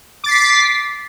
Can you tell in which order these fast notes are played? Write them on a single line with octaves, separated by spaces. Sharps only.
D6 A6 C7 B6